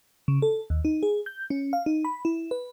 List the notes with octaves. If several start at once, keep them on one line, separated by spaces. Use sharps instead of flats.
C#3
A4
D#2
D#4
G#4
G6
C#4
F5
D#4
B5
E4
B4